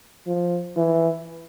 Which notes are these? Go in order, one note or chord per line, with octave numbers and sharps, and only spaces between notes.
F3
E3